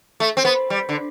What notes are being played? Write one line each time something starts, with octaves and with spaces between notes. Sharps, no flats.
A3
C4
B3
G3
D3